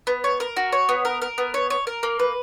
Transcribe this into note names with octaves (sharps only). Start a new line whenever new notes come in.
B3
C#5
A#4
F#4
C#5
B3
A#4
A#4
B3
C#5
C#5
A#4
A#3
B4